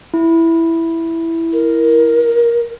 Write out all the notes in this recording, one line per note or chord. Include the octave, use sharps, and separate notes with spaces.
E4
A#4